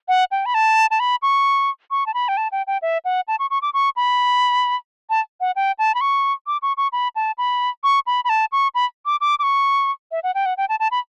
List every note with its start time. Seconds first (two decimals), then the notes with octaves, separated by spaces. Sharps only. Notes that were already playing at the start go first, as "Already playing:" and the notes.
0.08 F#5
0.31 G5
0.46 B5
0.54 A5
0.91 A5
1.00 B5
1.22 C#6
1.91 C#6
2.06 A5
2.14 B5
2.28 G5
2.37 A5
2.52 G5
2.67 G5
2.82 E5
3.05 F#5
3.28 A5
3.39 C#6
3.50 C#6
3.62 D6
3.74 C#6
3.96 B5
5.10 A5
5.41 F#5
5.56 G5
5.79 A5
5.95 B5
6.01 C#6
6.47 D6
6.62 C#6
6.77 C#6
6.92 B5
7.16 A5
7.38 B5
7.84 C#6
8.07 B5
8.25 B5
8.29 A5
8.52 C#6
8.75 B5
9.06 D6
9.21 D6
9.39 D6
9.43 C#6
10.12 E5
10.23 F#5
10.35 G5
10.46 F#5
10.57 G5
10.69 A5
10.80 A5
10.91 B5